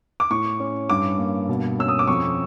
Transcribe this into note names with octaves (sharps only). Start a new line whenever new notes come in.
D6
A2 C#6
C#4
G2 D6
A#3
B2
C#4 E6
D#6
D6
F2 C#6